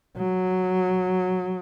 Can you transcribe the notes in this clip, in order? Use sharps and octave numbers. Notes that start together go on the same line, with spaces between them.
F#3